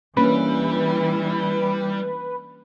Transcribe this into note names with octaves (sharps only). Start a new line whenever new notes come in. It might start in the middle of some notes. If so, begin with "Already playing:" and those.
E3 G3 A#3 C#4 D4 E4 B4